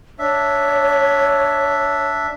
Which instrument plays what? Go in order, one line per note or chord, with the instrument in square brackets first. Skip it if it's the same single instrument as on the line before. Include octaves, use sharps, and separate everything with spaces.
[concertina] D4 E5 [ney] C#5